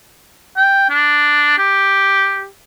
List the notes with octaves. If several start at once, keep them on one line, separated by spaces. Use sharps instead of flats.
G5
D4
G4